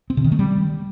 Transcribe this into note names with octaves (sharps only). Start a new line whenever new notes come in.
C4
C#3
D#3
A3
G3